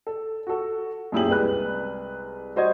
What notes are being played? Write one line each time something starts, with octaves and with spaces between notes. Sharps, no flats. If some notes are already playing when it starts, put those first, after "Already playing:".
A4
F#4 A4
F#2 A#2 E4 G4 G#4 F#7
C2 G#3 B4 F#6
G3 F#4 C5 D#5 G#6